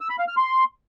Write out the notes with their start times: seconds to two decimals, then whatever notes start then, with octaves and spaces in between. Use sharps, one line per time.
0.01 E6
0.10 B5
0.19 F5
0.28 F6
0.37 C6